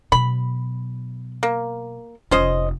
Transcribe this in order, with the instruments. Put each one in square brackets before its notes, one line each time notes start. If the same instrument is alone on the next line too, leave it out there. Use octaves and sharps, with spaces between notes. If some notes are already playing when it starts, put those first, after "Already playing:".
[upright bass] B2 F#3 [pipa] B5
[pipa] A#3
[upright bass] F1 F4 [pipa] C#4 C5 D#5